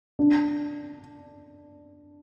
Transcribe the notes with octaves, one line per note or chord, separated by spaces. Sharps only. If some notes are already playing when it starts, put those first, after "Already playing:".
D4